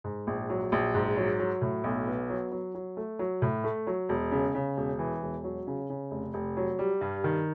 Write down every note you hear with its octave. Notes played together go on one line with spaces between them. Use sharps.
G#2
A#1
F#3
A#1
G#2
F#3
F#3
A2
B1
B3
F#3
F#3
F#3
A3
F#3
A2
A3
F#3
E1
C#3
C#3
E1
E3
E1
F#3
C#3
C#3
F1
F1
F#3
G3
G2
D#3